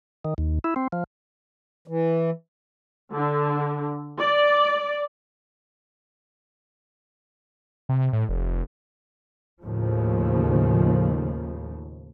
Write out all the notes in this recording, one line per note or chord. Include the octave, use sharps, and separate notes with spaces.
D#3
D#2
E4
C4
F3
E3
D3
D5
C3
A2
F1
D#2 A2 C#3 F3